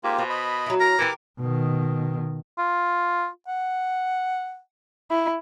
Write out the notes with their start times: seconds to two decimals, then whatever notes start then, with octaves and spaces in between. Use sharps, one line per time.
0.04 G#2 A#3 F4 G4
0.18 B2 C5
0.30 D#5 B5
0.66 F#3 E4
0.80 A#5 F6
0.99 E3 G4 A#4 D6
1.39 B2 D#3
2.58 F4
3.48 F#5
5.11 E4